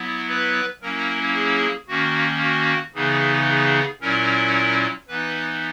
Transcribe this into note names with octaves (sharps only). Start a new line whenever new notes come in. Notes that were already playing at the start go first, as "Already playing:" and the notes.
Already playing: F#3 B3 E4
B4
F#3 A#3 C#4 E4 A#4
G#4
D#3 A#3 C#4 F#4
F#4
C#3 E3 B3 D#4 G#4
G#4
A#2 F#3 C#4 E4 A#4
E3 B3 D#4 B4